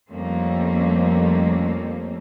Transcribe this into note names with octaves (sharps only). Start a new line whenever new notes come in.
F2 G3 A3 A#3 C4 C#4